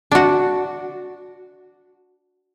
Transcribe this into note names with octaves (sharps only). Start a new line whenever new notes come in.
D4 F#4